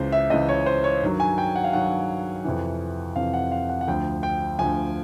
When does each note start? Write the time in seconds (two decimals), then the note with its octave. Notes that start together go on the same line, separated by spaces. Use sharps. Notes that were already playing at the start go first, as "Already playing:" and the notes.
Already playing: C#2 C#3 E3 C5
0.12 E5
0.30 C#2 C#3 E3 D#5
0.49 C#5
0.66 C5
0.84 C#5
1.02 G2 D#3 F#3
1.20 G#5
1.38 G5
1.56 F#5
1.64 F5
1.73 G2 D#3 F#3 F#5
2.45 F2 C3 E3
3.16 F2 C3 E3 F5
3.34 F#5
3.52 F5
3.69 F#5
3.81 F#5
3.87 D2 D3 F3 G5
4.23 G5
4.59 D2 D3 F3 G#5